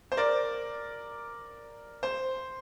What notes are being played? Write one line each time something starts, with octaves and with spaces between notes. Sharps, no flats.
C5
A#4 D5
C5